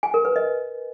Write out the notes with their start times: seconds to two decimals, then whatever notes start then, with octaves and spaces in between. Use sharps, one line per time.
0.03 G#5
0.14 A#4
0.25 B4
0.36 D#5